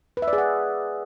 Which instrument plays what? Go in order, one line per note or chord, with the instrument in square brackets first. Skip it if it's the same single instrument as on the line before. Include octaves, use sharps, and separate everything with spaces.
[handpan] B4
E5
D5
G#4
F#5